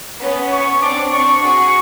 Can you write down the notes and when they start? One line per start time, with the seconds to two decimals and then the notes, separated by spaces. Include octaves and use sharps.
0.21 B3 C#4
0.52 C#6
0.82 C4 D4 D6
1.12 C4 D4 C#6
1.43 F#4 G#4 C#6